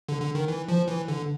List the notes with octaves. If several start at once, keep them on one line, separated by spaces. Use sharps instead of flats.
D3
D3
D#3
E3
F3
E3
D3